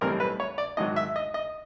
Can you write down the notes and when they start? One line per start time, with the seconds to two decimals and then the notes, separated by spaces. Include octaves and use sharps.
0.01 B1 A2 E3 G3 C4 A#4
0.20 B4
0.40 C#5
0.58 D5
0.77 G#1 G#2 D#3 F#3 D#5
0.96 E5
1.16 D#5
1.34 D#5